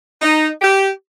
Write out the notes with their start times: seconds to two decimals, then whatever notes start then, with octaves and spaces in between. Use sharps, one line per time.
0.22 D#4
0.62 G4